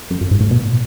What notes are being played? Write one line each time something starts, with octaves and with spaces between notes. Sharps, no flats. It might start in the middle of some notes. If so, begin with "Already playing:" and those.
F#2
F#2
G#2
A2
B2
A2
B2